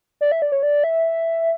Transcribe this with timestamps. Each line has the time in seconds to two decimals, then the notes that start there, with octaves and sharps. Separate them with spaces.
0.21 D5
0.32 E5
0.42 D5
0.52 C#5
0.63 D5
0.84 E5